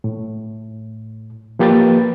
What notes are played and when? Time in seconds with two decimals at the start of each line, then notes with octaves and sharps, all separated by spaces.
0.04 A2
1.59 F3 A#3 G4 B4 A6